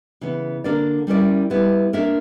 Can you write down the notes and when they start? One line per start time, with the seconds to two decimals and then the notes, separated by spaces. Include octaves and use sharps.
0.21 C#3 E3 B3
0.64 D3 A#3 D4 A#4 D5
1.07 G3 C#4 E4 A#4 D5
1.50 G3 B3 E4
1.93 A#3 D4 A#4 C#5 E5